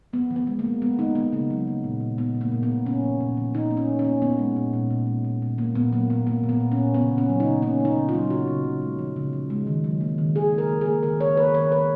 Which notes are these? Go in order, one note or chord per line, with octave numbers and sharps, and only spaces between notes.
F3 B3
F3
B3
G#3
A#3
G#3
G#3 B3
G#3 D#4
G#3 B3
C#3 A#3
F#3
A#3
A#2
A#2
A#2 B3
A#2
A#3
A#2
B3
A#2
A#2 C#4
F3
A#2
F3
A#2 D#4
A#3
C#4
F3
C#4
A#3
A#2 B3
G#3
A#2
A#2
A#2
G#3
A#2
A#2
A#3
A#2 B3
F#3 A#3
A#2 B3
A#3
A#2
B3
A#2
C#4
A#2
C#3 B3
C#3
C#4
F#3
D#4
C#3
A#3 C#4
A#3 D#4
C#3
F4
F#3
C#3 F#4
C#3
C#3
G#3
F3
C#3
F3
G#3
D#3
F#3
A#3
D#3
D#3 G#4
A#3
A#4
A#3
G#4
A#3
D#3 A#4
D#3 C#5
A#3 B4
D#3 C#5
D#3 B4